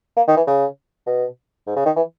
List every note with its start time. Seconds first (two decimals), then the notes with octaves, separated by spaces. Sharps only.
0.17 A#3
0.28 D#3
0.37 E3
0.47 C#3
1.07 B2
1.67 G#2
1.76 C#3
1.86 D#3
1.96 E3